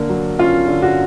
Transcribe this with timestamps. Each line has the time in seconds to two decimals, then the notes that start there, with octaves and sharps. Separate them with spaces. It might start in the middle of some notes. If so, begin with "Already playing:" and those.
Already playing: D3 A#3
0.09 F#3
0.39 C#4 F4
0.68 D3
0.82 F#4